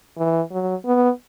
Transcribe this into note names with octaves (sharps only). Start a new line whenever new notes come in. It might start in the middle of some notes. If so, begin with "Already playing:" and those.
E3
F#3
B3